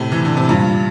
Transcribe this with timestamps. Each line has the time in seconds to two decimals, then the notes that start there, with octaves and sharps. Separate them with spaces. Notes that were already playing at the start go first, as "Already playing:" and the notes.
Already playing: A2 C3
0.12 E3
0.25 D3
0.37 C3
0.49 G2 A#2